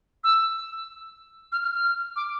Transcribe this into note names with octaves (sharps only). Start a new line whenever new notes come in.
E6
F6
F6
F6
D6